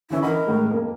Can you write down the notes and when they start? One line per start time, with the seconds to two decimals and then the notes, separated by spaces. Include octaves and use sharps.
0.10 D3 E3 C#4 E4
0.23 A#4 D#5 F#5 B5
0.47 A2 G#3
0.71 F2 A#3